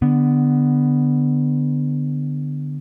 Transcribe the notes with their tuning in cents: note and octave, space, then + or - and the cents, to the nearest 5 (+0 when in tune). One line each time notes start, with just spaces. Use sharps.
D3 +5 B3 +5